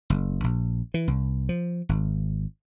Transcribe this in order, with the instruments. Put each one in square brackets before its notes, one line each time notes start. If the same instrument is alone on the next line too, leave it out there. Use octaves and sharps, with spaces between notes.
[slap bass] F#1
A#1
E3
C2
F3
G#1